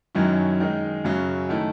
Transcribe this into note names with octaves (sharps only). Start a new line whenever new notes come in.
F#2 D#3 F#3 C#4 E4
D#3 G#3 D#4
F#2 C#3 F#3
D#3 A3 E4